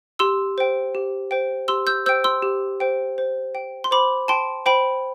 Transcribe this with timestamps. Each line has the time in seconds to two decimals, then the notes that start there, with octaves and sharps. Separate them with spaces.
0.19 G4 C6 E6
0.58 C5 G5
0.95 G4
1.31 C5 G5
1.68 G4 C6 E6
1.87 E6 G6
2.06 C5 G5 E6 G6
2.24 C6 E6
2.42 G4
2.80 C5 G5
3.18 C5
3.55 G5
3.84 C6
3.91 C5 B5 D6
4.28 G5 A5 C6
4.66 C5 G5 B5